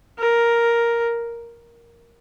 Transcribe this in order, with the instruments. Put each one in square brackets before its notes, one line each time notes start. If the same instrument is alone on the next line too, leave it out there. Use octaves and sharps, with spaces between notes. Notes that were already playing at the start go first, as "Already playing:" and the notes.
[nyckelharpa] A#4